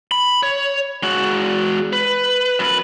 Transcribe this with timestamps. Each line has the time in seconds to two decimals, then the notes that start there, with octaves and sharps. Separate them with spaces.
0.11 B5
0.43 C#5
1.03 G#3 F#4
1.93 B4
2.59 F#2 B4